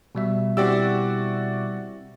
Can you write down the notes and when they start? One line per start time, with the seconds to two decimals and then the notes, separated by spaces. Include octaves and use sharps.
0.15 B2 G3 E5
0.57 C4 E4 F#4 G4 D5 E6